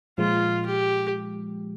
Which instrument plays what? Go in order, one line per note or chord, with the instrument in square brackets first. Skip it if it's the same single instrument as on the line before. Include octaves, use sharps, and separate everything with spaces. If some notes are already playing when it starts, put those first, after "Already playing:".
[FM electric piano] A#2 F3 G#3 [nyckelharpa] F4
[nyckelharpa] G4